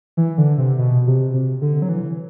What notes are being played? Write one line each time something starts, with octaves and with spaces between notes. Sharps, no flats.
E3
D3
C3
B2
C3
C3
D3
F#3
E3